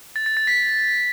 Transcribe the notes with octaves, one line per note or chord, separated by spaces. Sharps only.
A6
A6
A6
B6